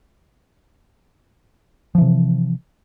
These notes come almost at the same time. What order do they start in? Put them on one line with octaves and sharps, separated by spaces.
F3 E3 C3